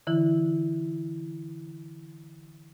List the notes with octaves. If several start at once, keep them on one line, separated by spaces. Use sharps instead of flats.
D3 E3 E4